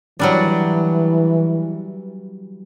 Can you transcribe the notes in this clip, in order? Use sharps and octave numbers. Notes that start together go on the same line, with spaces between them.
E3 F#3 G3 D4